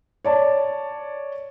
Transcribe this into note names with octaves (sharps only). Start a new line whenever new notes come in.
C#5 D5 A5